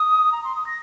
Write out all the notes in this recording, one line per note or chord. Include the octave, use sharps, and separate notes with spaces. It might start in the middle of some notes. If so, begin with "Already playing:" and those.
Already playing: D#6
A#5
C6
D#6
A#6